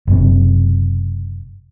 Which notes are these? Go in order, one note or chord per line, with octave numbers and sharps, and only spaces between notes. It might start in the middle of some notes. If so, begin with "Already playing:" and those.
F#1 F#2 C3